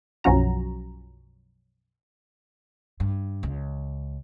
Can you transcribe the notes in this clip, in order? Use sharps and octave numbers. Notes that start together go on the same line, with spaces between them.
B1 F#2 F3 C#4 F#4 A#5
G2
C#2